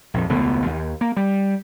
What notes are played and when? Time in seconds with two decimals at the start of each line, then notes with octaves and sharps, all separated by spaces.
0.14 A#1 F2
0.29 E1 C#2 A3 B3
0.66 D#2
1.01 A#3
1.17 G3